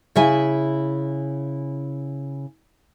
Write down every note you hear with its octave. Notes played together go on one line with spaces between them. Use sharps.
C#3 E4 E5 G#5